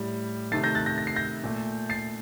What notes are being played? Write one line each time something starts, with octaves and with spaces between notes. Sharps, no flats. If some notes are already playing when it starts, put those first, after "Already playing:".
Already playing: A2 G3
C3 D#3 A3 A6 C7
G6 A#6
F#6 A6
G6 A#6
A#6
C7
G6 A#6
A#2 A3
A6 C7